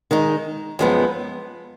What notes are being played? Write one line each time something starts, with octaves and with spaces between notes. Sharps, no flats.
D#3 G#3 D#4
F#2 F3 G#3 B3